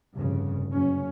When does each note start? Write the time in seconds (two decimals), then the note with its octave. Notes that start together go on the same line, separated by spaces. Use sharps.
0.14 F1 G2 C#3
0.71 F#1 C#4